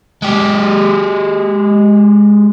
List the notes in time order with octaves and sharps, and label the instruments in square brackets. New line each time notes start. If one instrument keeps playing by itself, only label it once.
[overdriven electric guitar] G#3 G4